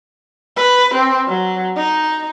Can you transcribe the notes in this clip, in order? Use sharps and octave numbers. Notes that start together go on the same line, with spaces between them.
B4
C4
F#3
D#4